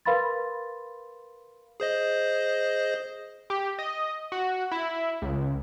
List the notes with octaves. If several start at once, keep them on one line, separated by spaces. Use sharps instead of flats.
A#4 B4 F5 B5 C6 A6
G#4 C5 D#5
G4
D#5
F#4
E4
C#2